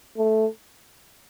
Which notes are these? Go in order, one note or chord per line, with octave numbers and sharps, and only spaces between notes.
A3